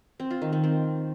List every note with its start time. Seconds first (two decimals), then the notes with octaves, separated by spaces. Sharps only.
0.20 C4
0.31 F4
0.42 D#3
0.53 D#3
0.64 C4